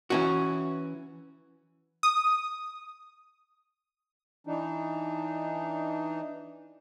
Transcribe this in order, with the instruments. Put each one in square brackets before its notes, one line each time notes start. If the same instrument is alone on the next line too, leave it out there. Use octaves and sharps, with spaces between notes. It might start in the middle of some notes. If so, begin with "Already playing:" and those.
[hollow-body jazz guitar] E3 C#4 F#4
[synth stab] D#6
[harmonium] E3 D4 D#4